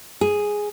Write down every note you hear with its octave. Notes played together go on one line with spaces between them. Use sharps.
G#4